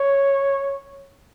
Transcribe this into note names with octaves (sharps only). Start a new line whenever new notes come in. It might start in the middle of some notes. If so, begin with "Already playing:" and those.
Already playing: C#5